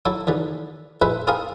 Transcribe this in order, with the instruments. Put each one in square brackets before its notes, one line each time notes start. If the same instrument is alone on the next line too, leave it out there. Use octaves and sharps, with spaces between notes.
[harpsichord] F#3 E4 A4
D#2 D3 E3
A#1 G#3 E4 B4 C5 E5
C4 E4 G#4 A#4 F5 G#5